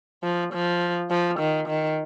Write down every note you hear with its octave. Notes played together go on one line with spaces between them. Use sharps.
F3
F3
F3
D#3
D#3